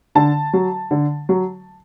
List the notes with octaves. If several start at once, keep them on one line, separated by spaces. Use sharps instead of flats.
D3 A5
F#3
D3
F#3